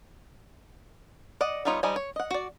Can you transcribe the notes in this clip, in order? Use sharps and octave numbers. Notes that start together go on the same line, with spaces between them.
D5 D#5 F#5
G3 B3 D#4 F4 C#5
F3 G3 D#4 D#5 G#5
C#5
D#5 F#5
F#4 D5